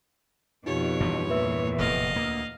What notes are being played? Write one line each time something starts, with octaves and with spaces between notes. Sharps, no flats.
F2 B2 D#4 F4 G4 C#5
G2 E3 F3
E2 A#2 B4 E5 E6
F1 A2 D#5 F5
D2 A#3